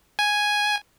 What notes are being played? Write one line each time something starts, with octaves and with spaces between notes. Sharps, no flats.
G#5